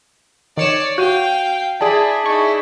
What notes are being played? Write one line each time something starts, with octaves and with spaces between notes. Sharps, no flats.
D#3 C#5 D5 C#7 E7
F#4 F5 G5 G6 D#7
E4 G#4 D5 A5
D#4 E4 C#6